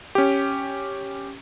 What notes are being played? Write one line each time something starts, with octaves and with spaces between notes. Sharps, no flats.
C#4 G4